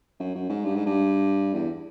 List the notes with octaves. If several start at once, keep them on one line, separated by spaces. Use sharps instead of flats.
F#2
F#2
G#2
G2
G#2
G2
E2